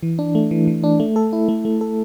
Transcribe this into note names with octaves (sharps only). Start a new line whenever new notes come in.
E3
D4
A3
E3
E3
D4
A3
A4
E4
A3
A3
A4